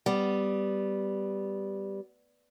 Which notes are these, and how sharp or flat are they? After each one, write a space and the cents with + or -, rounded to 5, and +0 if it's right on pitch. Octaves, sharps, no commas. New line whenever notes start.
G3 +0 B3 +15